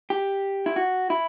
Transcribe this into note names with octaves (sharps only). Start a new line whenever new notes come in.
G4
E4
F#4
E4